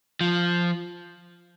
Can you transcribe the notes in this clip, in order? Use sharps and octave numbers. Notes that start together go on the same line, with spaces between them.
F3